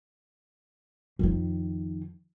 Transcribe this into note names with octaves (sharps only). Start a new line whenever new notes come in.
F2 D#3